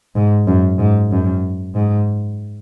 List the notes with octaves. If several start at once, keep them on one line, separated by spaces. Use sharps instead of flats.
G#2
F#2
G#2
F#2
G#2